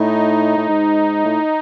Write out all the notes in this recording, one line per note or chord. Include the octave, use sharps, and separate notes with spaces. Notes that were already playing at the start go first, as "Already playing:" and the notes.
Already playing: A2 D#4
A2
G#2
A2